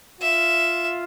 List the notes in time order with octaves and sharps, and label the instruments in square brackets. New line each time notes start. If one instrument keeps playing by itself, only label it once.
[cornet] F4 [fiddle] E5